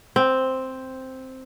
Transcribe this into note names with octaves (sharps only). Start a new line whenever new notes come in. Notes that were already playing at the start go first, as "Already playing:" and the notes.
C4